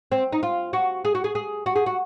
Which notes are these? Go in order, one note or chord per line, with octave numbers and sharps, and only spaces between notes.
C4
D#4
F4
F#4
G#4
F#4
G#4
G#4
F#4
G#4
F#4